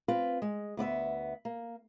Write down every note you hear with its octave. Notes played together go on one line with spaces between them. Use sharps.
C4 F4 B4
G#3
D2 B3 D5 E5
A#3